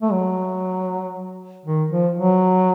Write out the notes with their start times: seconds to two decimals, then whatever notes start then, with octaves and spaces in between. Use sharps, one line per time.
0.02 A3
0.12 F#3
1.66 D#3
1.91 F3
2.16 F#3